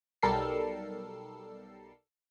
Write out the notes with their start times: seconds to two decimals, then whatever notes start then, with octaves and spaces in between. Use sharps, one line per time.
0.23 B1 G3 A4 A#4 E6 C7